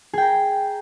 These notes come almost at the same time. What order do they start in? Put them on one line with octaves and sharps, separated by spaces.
G#4 G5 A#5